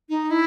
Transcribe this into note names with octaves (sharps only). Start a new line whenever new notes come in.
D#4
E4